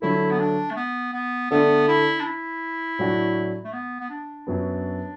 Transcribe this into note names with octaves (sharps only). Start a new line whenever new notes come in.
D3 F#3 A3 E4
B3
D4
A3
B3
B3
D3 A3 B3 D4 A4 D5
E4
D4
E4
A2 F#3 D4 F#4
A3
B3
B3
D4
F#2 F#3 B3